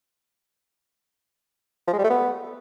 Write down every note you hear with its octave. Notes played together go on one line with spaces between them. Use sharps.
F3
G#3
G3
A3
B3